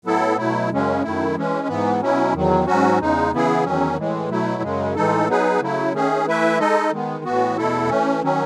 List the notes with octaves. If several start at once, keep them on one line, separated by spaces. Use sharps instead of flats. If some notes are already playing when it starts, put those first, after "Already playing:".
A2 F#3 B3 E4 A4
B2 F#3 A3 E4
F#2 C#3 G#3 C#4
F#2 D#3 A3 E4
E3 G#3 C#4
G#2 E3 B3
B2 F#3 C#4 E4
E2 D#3 F#3
G#2 F#3 C#4 F#4
E2 C#3 G#3 D#4
C#3 E3 B3 E4 G#4
E2 D#3 F#3 C#4
A2 E3 G#3
B2 F#3 A3 E4
F#2 C#3 G#3
A2 E3 G#3 D#4 A4
F#3 B3 D#4 G#4 B4
C#3 F#3 A3 E4
D#3 A3 C#4 G#4
E3 A3 E4 B4 E5
G#3 D#4 A4 D#5
D#3 G#3 B3
A2 E3 B3 F#4
E2 B2 A3 E4 A4
E3 A3 C#4
D#3 F#3 C#4